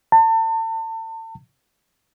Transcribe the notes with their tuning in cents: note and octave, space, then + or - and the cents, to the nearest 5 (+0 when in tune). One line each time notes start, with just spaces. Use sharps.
A5 +35